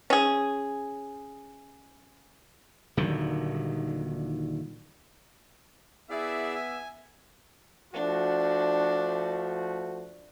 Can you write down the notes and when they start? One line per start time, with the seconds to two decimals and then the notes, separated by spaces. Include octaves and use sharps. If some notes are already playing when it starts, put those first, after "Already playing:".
0.10 C#4 G#4
2.97 D#1 D3 D#3 F#3
6.10 B3 E4 G#4 D5 E5
6.55 G#5
7.93 F3 A3 D4 F#4